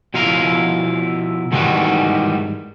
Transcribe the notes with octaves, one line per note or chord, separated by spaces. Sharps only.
B2 F3 E4 F5 A#5
G#2 D#3 E3 G3 G#3 F#4